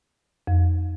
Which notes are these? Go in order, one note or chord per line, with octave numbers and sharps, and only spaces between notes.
F2